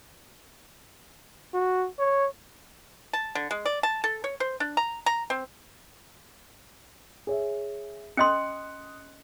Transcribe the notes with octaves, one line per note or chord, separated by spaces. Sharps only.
F#4
C#5
A5
D3
G#3
D5
A5
A4
C#5
C5
D4
A#5
A#5
C4
G#4 C#5 E5
C#4 D#5 C6 D#6 F#6 C#7